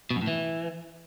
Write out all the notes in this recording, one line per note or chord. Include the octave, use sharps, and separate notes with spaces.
B2
F#2
A2
E3